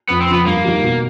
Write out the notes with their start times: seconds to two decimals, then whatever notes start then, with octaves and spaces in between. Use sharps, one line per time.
0.09 F2 B3
0.21 C4
0.28 C#3 F3 B3
0.46 G2 A#3
0.65 D#3 G3
0.83 B2